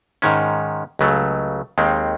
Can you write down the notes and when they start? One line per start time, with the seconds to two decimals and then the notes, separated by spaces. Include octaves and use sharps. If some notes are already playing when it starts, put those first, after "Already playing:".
0.22 G#2 D#3 G#3 C#4
0.99 C#2 C#3 F#3 A3
1.78 D#2 D#3 G#3 C4